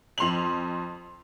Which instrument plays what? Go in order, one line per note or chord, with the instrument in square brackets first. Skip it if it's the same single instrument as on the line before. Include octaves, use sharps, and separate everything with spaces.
[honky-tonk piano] F2 C6 F7 F#7